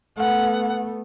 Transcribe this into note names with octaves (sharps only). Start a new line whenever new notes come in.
A3 B3 F#5